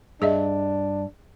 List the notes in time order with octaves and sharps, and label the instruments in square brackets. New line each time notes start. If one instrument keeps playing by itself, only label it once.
[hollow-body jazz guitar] G2 [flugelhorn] D4 [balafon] G#4 D#5 E5